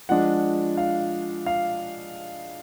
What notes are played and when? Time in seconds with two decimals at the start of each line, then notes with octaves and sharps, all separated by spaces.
0.09 F3 G#3 D4 F#5
0.77 F5
1.46 F5